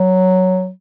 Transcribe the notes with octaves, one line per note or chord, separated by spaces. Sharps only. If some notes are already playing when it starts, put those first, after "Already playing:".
Already playing: F#3